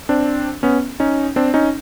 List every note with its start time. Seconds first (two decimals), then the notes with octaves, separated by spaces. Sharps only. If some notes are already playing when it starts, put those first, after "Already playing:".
0.09 C4 D4
0.63 B3 C#4
1.00 C#4 D#4
1.36 C4 D4
1.54 C#4 D#4